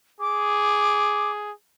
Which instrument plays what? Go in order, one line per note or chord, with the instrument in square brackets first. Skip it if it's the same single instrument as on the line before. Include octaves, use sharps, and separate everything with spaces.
[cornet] G#4 [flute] D6